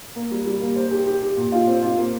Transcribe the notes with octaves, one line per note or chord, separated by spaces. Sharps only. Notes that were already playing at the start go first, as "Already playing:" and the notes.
A#3
G3
G3
A#3
C5
G4
G4
G4
A#2
F4
C4
F4
A#3